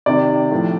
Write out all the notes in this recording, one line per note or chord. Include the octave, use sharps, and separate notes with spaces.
C3 D#3 D5
A2 F3